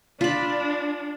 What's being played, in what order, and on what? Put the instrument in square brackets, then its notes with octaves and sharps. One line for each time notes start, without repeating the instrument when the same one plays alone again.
[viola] D4 [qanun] F4 B5